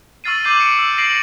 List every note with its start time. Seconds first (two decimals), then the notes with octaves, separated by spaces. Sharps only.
0.24 C#6 E6 F6 A6 C7 D#7
0.44 D6 E6 G6 C7 D#7 F#7
0.60 C#7 D7
0.79 E6
0.98 A#6 C7 D7 F#7